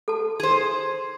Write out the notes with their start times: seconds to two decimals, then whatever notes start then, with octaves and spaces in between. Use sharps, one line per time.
0.08 A4 A5
0.40 G#4 C5